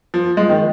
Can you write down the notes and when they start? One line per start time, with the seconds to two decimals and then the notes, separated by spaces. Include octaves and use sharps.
0.14 F3
0.37 G#3
0.49 D#3